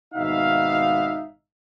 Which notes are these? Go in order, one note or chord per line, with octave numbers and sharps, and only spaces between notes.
G#1 B2 D#4 E5 F5